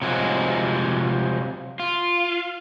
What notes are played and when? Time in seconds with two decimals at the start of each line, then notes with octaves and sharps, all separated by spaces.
0.02 C3 F3 F#3 G#3
1.80 F4